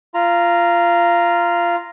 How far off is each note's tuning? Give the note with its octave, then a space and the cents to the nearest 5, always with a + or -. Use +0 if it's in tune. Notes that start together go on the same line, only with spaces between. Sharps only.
F4 -15 A#5 +0